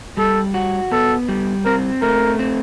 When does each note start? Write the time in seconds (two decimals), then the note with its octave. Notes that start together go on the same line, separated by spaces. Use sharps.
0.17 G3 A4
0.54 F#4
0.92 B3 A4
1.29 G3
1.65 C4 A#4
2.02 A3 A#4
2.39 C4